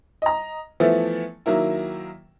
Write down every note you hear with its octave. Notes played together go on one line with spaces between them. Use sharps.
D#5 A#5
E3 F3 A3 B3
D#3 F#3 A#3 E4